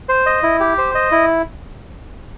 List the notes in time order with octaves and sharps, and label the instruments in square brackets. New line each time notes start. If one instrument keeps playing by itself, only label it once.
[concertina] C5
D#5
E4
G4
C5
D#5
E4